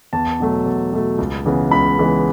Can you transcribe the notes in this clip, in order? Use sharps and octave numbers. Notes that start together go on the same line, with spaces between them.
E2 A5
B2 F#3 A3
E2
B2 F#3 A3
C#2
C#3 E3 G#3 B3
C#2 B5
C#3 E3 G#3 B3